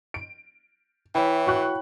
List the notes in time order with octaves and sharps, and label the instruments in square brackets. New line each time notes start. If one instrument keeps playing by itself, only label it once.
[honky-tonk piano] D7
[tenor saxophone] E3 [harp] E4 C#5 E5 [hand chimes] G5 B5
[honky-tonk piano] F#4 C#6 F#6